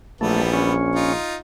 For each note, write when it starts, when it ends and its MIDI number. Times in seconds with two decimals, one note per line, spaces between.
0.21 1.14 34
0.21 0.74 52
0.21 0.74 55
0.21 0.42 57
0.21 0.74 59
0.53 1.13 61
0.95 1.36 63
0.95 1.36 65